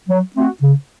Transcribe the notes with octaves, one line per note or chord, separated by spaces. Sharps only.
F#3
A3 C4 F#4
C#3